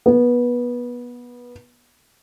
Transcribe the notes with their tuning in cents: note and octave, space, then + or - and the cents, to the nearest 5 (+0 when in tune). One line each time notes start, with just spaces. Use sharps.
B3 -20